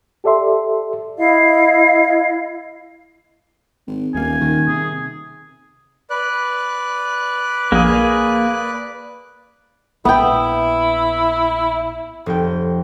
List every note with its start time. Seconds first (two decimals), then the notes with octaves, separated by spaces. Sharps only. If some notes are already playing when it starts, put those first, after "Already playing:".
0.24 G4 A4 D5 E5 C6
1.18 E4 D#5 F5
3.87 G#1
4.15 D#1 D#2 A#3 G#5
4.41 D#3
4.68 C3 G#4
6.10 B4 D5 F#6
7.72 A#1 A#3 G#4
10.05 A#1 B3 E4 G5
12.26 F1 G5